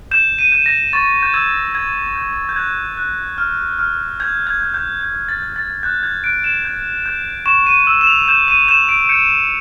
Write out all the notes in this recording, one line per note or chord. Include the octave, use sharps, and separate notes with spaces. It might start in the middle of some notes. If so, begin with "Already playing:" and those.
G6 E7
D#7
G6
A#6
C#6 A6
G6
E6 G#6
G6 G#6
G6
G6
F#6 G#6
F#6
F6
F6
G6 G#6
G#6
G6
G6
G6
A6
G6
A6
F#6 G6
G#6
F#6 D7
E7
G6
G6
C#6 E7
D#7
E6
E7
F7
G6 E7
D#7
G6 E7
D7
G6 C#7